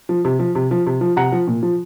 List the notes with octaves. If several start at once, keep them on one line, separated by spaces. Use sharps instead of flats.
F3
C3
F3
C3
F3
C3
F3
C3 F#5 A#5
F3
A#2
F3